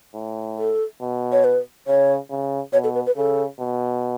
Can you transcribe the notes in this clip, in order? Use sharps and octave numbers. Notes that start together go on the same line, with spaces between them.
A2
A4
B2
C#5
B4
C#3 C#5
C#3
B2 C#5
A4
B4
B4
C#3 A4
B2